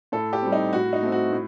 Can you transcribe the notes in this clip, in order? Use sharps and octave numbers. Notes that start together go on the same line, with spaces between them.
A2 A4
G4
G3 C4
D#4
A2 F#4
D#4
A3 C4
F#4
A2